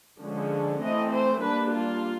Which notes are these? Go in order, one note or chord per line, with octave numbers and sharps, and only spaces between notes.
D3 F3 G#3 C#4
E3 A3 C4 D#5
C5
G3 A#3 D4 B4
F4